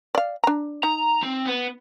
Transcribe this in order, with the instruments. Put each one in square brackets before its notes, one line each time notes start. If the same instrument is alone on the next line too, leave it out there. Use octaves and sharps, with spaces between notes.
[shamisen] D5 F5
D4 A#5
[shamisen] D#4 [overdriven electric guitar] A#5
[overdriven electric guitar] C4
B3